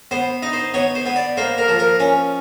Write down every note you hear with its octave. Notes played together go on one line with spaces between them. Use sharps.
B3 C5
D#4
C5
B3 C#5
C5
B3
D5
A#3 C5
A#4
F3
A#4
C#4